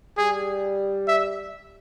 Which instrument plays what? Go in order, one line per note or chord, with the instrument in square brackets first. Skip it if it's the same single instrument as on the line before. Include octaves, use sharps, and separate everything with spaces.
[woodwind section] G3 [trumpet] G#4
[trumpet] E5